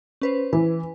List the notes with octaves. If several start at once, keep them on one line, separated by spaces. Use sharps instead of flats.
C#4 B4 C5
E3 B4